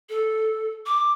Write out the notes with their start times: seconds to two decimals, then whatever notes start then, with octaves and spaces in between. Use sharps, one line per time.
0.09 A4
0.86 D6